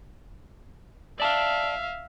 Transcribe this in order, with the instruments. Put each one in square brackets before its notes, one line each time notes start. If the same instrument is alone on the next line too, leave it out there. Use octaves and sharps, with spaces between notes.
[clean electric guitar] D5 A5 [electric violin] E5 F5